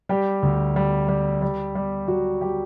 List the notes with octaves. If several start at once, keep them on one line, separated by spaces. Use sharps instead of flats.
G3 G4
D2
G3
G3
G3
G3
F#3 G3 F#4
G3 G4